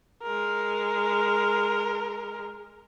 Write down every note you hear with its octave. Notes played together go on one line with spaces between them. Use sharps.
G#3 A#4